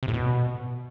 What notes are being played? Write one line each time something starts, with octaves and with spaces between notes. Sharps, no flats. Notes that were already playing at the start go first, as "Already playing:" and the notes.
C3
A2
B2